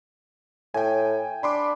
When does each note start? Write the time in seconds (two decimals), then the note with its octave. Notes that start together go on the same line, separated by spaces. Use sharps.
0.74 A2 G5 G#5
1.43 D4 B5 C6 D6